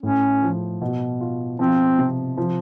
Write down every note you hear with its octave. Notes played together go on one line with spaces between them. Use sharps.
A2 C#4
F3
B2
F4
F3 C4
C3
F3